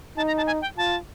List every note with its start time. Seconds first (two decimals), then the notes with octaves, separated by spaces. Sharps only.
0.17 D#4 A5
0.27 A#5
0.37 A5
0.47 G#5
0.62 G5
0.77 F4 A5